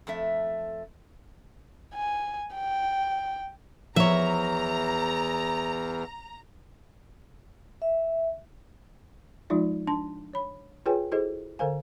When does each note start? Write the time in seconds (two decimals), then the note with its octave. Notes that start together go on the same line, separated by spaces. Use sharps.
0.07 F2 A3 E5
1.95 G#5
2.55 G5
3.96 E2 F3 C#5 E5 A#5
7.82 E5
9.50 F3 G#3 D#4 F4 D5
9.87 D4 A5 C6
10.33 C#5 B5
10.86 F4 G#4 B4 C#5 G5 G#5
11.11 E4 F#4 G#4 A4 C5 D#5
11.59 D3 A4 A#4 C5 F5 G#5